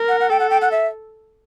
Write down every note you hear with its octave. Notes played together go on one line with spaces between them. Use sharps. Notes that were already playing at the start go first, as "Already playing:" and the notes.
Already playing: A#4
F#5
F#5
A4 G5
F#5
G5
F#5
E5